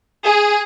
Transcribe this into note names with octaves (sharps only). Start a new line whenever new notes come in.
G#4